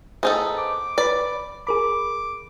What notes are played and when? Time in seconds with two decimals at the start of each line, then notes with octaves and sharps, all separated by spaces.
0.23 B3 D#4 G#4 A4 C5 G#5
0.58 D6
0.98 B4 D5 B5
1.67 G#4 A#4 B5 D6